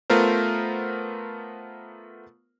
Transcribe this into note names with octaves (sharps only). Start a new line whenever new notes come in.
A3 B3 F4 A#4 C5